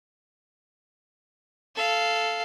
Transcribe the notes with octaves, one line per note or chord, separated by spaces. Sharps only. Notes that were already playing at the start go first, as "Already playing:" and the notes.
A4 F5